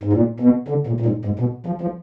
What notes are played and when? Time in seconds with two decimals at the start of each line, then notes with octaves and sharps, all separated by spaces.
0.03 G#2
0.13 A#2
0.40 B2
0.68 D3
0.87 A#2
1.00 A#2
1.06 G#2
1.25 G#2
1.39 B2
1.66 F3
1.81 F3